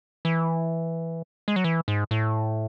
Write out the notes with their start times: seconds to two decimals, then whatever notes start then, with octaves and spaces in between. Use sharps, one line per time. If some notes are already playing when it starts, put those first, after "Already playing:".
0.25 E3
1.48 G#3
1.56 F#3
1.64 E3
1.88 G#2
2.11 A2